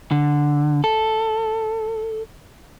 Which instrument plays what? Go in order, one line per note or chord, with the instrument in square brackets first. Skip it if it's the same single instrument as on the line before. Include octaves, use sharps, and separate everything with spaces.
[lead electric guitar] D3
A4